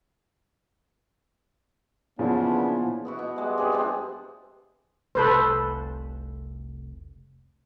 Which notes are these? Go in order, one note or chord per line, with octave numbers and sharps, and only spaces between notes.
A#2 C#3 E3 F3 B3 D4
B3 E4 F#4
B2
G3 G#3
G2 C4 G#4
F3 G#3 B3 C4
F1 C2 A4 B4 C5